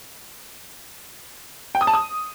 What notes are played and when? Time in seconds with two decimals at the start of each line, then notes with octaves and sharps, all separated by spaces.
1.75 G5
1.81 D#6
1.87 A5
1.94 D#6